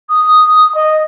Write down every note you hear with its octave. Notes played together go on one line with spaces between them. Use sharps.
D#6
D#5